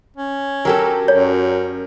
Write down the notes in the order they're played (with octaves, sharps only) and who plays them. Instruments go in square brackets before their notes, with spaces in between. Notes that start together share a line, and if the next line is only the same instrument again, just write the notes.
[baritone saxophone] C#4
[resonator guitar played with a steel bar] F#3 G4 A4 [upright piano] A#4
[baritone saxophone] F#2 [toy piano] C#5